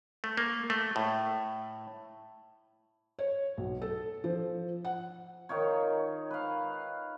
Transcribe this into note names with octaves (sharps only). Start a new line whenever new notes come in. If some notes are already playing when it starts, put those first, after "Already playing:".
A3
A#3
A3
A2
C#5
B1
A4
F3
F#5
D#3 D#4 F4 C#5
B4 F5